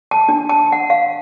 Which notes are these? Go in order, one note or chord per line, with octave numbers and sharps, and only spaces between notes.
A5
D4
A5
F#5
F5